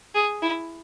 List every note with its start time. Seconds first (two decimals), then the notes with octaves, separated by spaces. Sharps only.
0.15 G#4
0.42 E4